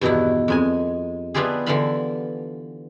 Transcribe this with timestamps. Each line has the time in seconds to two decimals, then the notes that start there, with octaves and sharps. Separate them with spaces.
0.01 E2 G2 B2 D#3 E4
0.48 F2 G#3 G#5
1.34 B3 D4 E4 F4 G4 G#4
1.66 D3 E3 F4 E5 F5 B5